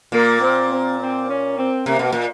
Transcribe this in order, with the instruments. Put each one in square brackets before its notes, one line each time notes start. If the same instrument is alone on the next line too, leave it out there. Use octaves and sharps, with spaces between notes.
[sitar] A#2 [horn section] A#3
[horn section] C4
C4
C4
C#4
C4
[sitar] C3 [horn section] A#3
[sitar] B2
A#2